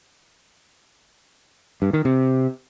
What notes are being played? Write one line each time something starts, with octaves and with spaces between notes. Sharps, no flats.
G2
D#3
C3